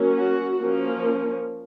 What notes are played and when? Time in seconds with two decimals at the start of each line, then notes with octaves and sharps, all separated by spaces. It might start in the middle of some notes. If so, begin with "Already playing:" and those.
Already playing: F#3 A#3 C#4
0.16 F#4
0.61 F3 A#3 C#4